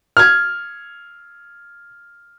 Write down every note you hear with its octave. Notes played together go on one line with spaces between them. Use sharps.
F6 G#6